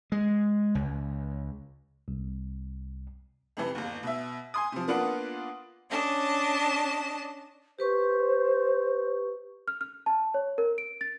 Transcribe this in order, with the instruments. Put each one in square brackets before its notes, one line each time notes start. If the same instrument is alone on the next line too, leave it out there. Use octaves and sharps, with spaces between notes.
[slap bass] G#3
C#2
[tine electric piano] C2
[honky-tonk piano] F2 C3 E3
G1 D#2
B2 E5
G#5 C6 D#6
C3 F3
A#3 B3 D4 F4 B4 F#5
[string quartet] C#4 D4 D#5 A5
[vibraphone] G4 B4 C#6 [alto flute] C5
[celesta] F6
F6
A5
C#5
A#4
D7
A6